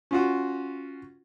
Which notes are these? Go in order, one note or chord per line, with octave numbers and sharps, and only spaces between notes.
C#4 F4 F#4